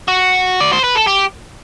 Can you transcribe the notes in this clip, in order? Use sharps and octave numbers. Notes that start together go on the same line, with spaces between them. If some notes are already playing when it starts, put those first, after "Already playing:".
F#4
D5
C5
B4
A4
G4